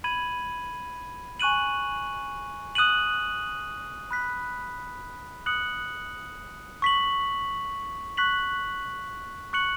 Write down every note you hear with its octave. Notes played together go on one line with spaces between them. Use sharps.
B5 G#6 D#7 F#7
G#5 C#6 F#6 D#7 F#7
D#6 F#6 D#7 F#7
B5 F#6 B6
D#6 F#6 C#7 F#7
C#6 B6 F#7
C#6 F#6 B6 F#7
C#6 F#6 C#7 F#7